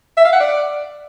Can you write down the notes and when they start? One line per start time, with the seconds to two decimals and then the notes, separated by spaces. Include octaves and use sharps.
0.17 E5
0.25 F5
0.32 F#5
0.40 D5